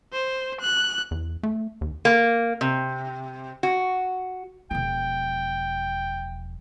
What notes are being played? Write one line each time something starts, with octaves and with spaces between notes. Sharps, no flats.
C5
F#6
E2
A3
D#2
A#3
C3
F#4
E1 F3 G5